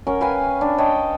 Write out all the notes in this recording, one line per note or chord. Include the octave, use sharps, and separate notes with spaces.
C#4 A#4 F#5
B4 F5 G5 G#5
D4
C#5 D#5 G5 A5